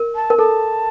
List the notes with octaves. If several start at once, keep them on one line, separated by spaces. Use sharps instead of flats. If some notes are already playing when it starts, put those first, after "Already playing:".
Already playing: A#4
A5
A#4
A4 A5